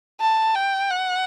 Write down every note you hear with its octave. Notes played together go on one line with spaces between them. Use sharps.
A5
G5
F#5